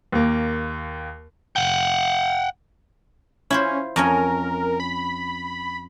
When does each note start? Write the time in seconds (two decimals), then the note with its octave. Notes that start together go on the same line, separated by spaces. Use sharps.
0.12 D#2 A#3
1.56 F#5 G5
3.50 C#4 E4 F4 C5
3.96 F2 C#4 A#4 G#5
4.80 B5